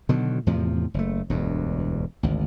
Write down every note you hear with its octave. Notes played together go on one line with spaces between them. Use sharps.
B2 D3 D#3 F#3
E2 A2 C3 F3
F#1 A3
E1 D2 G2
G#1 D2